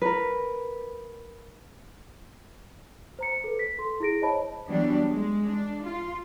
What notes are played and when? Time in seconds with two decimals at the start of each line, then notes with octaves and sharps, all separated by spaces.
0.02 A#4 B4
3.19 C5 A#5 C#7
3.44 A4 B4
3.59 B6
3.78 A4 C6
4.00 E4 G#4 A#6 D7
4.22 C5 C#5 D#5 A5 B5
4.65 E3 F#3 G3 B3 D4
5.10 G#3
5.44 D4
5.83 F4